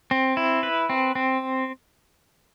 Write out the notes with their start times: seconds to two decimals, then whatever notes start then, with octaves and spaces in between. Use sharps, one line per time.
0.11 C4
0.37 E4
0.63 B4
0.90 C4
1.15 C4